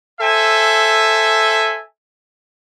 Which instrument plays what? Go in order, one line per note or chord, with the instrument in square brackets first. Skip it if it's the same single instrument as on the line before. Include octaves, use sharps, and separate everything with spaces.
[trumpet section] A4 C5 E5 G#5